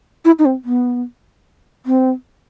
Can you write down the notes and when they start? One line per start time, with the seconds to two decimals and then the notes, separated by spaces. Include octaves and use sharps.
0.25 E4
0.39 D#4
0.45 C4
0.65 B3
1.86 C4